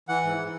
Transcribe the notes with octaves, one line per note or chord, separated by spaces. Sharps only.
E3 F#5
G#2
E3